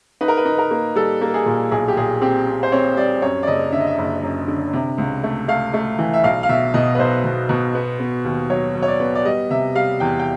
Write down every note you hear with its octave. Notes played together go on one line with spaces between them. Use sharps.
D#4 B4
A#4
B4
D#4
A#4
A#3
G3 A4
A#3
G#4
A#2
B1 G#4
G4
A#2 G#4
C4 G4
C4
C5
C4 C#5
G3 D5
F#2 C#5
D5
F#1 D#5
D3 E5
D#5
E5
F#1
F#2
D3
C3
C#2
A3
A3 F5
A3
E3
E5
B1 F5
F5
B2 E5
B2 D#5
B4
B1 C5
B2
B2
B3
B3
D#2
F#3 C#5
F#3
C#5
D5
B3
D5
G3 D#5
C3 E5
G3 F5
E2 G5
G5